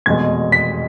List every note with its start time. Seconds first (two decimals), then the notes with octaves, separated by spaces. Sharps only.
0.06 F1 E2 B2 G#3 G#6
0.52 B6